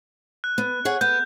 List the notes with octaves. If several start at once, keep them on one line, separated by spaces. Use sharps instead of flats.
F#6
B3
G#4 C#5 F#5
B3 G6